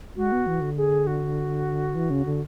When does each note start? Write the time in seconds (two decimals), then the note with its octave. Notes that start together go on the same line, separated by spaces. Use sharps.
0.16 G#3 F#4
0.32 B3
0.47 E3
0.61 D3
0.77 G#4
1.07 F#4
1.95 E3
2.10 C#3
2.25 D3